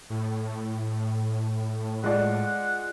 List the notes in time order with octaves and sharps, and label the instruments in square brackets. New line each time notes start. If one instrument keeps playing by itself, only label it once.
[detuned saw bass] A2
[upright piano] G#3 F4 D5 [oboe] F#5